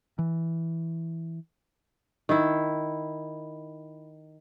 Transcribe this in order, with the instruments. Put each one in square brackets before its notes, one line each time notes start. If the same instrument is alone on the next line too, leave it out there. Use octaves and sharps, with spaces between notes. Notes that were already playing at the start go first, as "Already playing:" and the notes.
[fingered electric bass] E3
[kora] D#3 E4